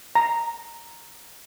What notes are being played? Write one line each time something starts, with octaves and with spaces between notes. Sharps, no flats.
A#5